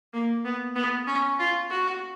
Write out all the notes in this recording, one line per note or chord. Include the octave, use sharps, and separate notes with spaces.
A#3
B3
B3
C#4
F4
F#4